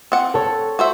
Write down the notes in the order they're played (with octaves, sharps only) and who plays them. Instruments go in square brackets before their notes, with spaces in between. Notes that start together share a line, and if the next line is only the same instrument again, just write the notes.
[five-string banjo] C4 F#5
[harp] A4 C#5
[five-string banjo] F#4 C5 E5